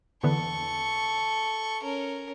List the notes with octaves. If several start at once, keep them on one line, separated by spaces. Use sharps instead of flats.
E2 D3 B3 A4 C#6
C#4 A#4